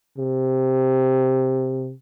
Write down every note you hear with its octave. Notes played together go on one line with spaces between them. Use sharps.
C3